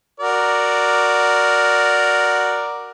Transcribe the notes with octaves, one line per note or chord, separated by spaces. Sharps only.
F#4 A#4 D5